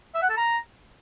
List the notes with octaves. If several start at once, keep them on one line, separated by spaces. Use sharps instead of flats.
E5
F#5
A4
A#5